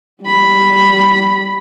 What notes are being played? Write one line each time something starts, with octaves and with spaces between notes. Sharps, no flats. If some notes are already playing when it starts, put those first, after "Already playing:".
G3 B5